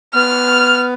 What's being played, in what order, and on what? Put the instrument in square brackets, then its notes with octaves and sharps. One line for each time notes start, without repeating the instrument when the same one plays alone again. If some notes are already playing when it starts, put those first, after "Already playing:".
[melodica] B3 [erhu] F6